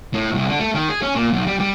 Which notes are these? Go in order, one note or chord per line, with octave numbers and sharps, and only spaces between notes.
A2
C2
D3
A3
D#3
G#4
C#4
A#2
B1
G3
G3